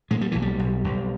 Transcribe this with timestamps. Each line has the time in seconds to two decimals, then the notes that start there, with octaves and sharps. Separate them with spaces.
0.11 A#2 G#3
0.21 G3
0.32 B1 E3
0.42 G3
0.59 B1
0.84 B1